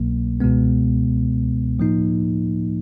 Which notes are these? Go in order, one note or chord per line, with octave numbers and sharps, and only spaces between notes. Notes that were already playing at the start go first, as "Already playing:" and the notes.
Already playing: C2 B2 F#3 A#3
C#2 B2 G#3 B3
A2 F3 A#3 D#4